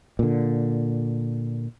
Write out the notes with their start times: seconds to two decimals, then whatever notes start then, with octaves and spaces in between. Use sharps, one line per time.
0.19 A#2 D3